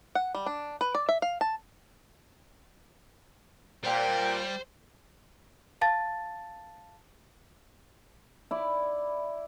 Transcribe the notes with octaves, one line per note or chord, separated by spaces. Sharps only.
F#5
G3
D4
B4
D5
E5
F5
A5
A#2 G3 C5 G5
F5 A5 A6
E4 D5